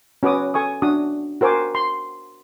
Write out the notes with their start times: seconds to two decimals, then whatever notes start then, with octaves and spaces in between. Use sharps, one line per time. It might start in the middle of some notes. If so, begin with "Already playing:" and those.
0.23 C#4 F#4 B4 D6 D#6
0.54 A4 G#5 C#6 D#6
0.82 D4 F#4 D#6
1.41 F#4 A#4 C5 G#5 D6
1.75 C6